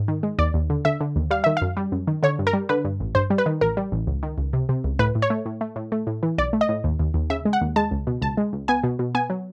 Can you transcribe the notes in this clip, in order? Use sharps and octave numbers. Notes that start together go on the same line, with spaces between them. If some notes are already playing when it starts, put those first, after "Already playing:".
Already playing: G#2
D#3
G#3
D#2 D5
D#2
D3
D3 E5
D3
D#2
G3 F5
D#3 E5
F#2 F5
G3
F#2
D#3
D3 C#5
G2
A#4
G3
D3 B4
G2
A1
G2 C5
G3
B4
D#3
A1 A#4
G3
A1
C#2
D#3
C#2
C3
C3
C#2
A2 B4
A2
C#5
A3
A2
A3
A2
A3
A2
E3
B1 D5
A3
D#5
A2
D#2
D#2
D#2
C#3 E5
G#3
F#5
D#2
G#3 A5
C#2
B2
C#2 A5
G#3
C#2
B3 G#5
B2
B2
B3 G#5
F#3